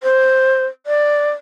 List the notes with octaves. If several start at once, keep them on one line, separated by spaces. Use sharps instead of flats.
C5
D5